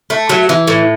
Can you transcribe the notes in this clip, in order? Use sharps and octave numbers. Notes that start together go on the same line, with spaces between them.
A3
F#3
E3
A2